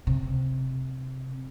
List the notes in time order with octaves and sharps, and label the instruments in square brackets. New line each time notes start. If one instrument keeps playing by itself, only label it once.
[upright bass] C3